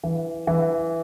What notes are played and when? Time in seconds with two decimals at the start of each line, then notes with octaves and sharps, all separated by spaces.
0.03 E3
0.47 E3